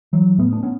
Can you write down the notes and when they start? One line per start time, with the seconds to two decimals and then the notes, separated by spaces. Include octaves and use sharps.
0.13 E3 F#3
0.38 A2 A3 B3
0.53 D4
0.63 B3 C#4